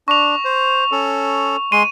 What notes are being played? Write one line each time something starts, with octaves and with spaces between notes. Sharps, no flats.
D4 C#6 F7
C5
C#4 A4
G#3 C6 D#7